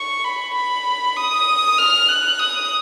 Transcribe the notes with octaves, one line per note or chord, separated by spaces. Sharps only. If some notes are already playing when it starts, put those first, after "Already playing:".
Already playing: C#6
B5
B5
D#6
F6
F#6
D#6